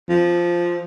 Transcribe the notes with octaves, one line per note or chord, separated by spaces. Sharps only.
F3